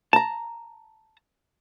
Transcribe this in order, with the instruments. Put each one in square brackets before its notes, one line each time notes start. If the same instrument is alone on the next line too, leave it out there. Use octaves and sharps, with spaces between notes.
[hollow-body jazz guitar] A5 A#5